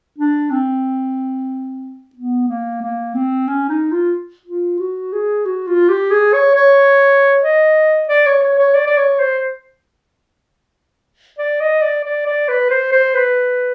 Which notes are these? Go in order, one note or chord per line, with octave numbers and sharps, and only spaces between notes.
D4
C4
B3
A#3
A#3
C4
C#4
D#4
F4
F4
F#4
G#4
F#4
F4
G4
G#4
C#5
C#5
D#5
D5
C#5
C#5
C#5
D5
D5
C#5
C5
D5
D#5
D5
D5
D5
B4
C5
C5
B4